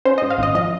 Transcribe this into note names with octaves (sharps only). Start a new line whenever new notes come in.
C#4 C5
G#2 D#5
F5
G#1 D#5
F3 D#5